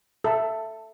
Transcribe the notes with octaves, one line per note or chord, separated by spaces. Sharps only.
A4 E5